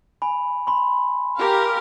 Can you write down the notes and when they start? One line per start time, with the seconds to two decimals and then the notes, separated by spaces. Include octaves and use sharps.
0.22 G#5 B5
0.67 B5 C6
1.39 G4 A#4 F5